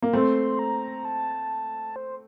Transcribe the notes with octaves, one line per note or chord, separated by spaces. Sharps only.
A#3
A3 C4 C6
A#5
A5
C5